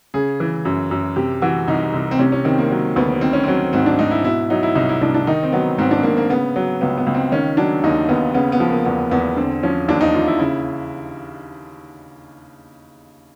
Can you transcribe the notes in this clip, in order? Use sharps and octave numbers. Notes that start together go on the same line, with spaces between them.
C#3 G#4
E3
F#2
F#2
C3 G4
E3 F#4
C2 D#4
C2
C4
C3 C#4
C#4
D#3 C4
A#3
F#3
D2 B3
D#3 C4
C#4
F#3 C4
G#2 C4
D4
G#2 D#4
E4
B2 E4
F#3 D#4
E4
C2 D#4
E4
C2 D4
D4
D#3 D#4
C4
F#3 B3
G#2 C4
D4
G#2 A#3
A#3
C#3 B3
F#3
C#2 B3
B3
C#2
C4
D#3 C#4
F#3 D4
D#2 D#4
D#2 B3
C#3 B3
B3
F3
A#3
E2 B3
E2 B3
D3 C4
F3 C#4
D#2 D4
D#4
D#2 F4
E4
C#3 E4